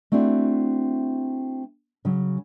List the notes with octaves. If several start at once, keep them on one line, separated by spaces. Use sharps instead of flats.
A3 C4 D4 E4 F#4
C#3 F#3